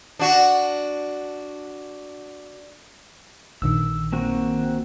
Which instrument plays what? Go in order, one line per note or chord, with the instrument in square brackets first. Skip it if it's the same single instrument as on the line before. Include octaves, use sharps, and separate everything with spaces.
[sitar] D4 F#4
[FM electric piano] A#1 D3 D#3 [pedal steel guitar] E6
[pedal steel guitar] A#3 C4 F#4